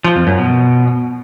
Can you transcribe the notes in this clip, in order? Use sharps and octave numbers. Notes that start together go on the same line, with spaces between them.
F3
F2
F#2
B2